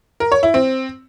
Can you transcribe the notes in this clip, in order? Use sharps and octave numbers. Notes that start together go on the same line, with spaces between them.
A#4
C#5
E4
C4